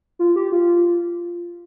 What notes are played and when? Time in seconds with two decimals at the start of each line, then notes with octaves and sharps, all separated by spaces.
0.19 F4
0.36 G4
0.52 F4